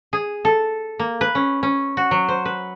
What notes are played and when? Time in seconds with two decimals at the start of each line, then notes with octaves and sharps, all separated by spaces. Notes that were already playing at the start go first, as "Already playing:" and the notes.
0.13 G#4
0.45 A4
0.99 A#3
1.21 B4
1.35 C#4
1.63 C#4
1.97 F#4
2.11 F#3
2.29 C5
2.45 B4